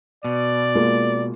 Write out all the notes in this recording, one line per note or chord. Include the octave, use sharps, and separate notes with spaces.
B2 D5
G#3 A#3 F4